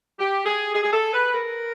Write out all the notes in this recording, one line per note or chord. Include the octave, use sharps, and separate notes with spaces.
G4
G#4
G#4
G#4
A4
B4
A#4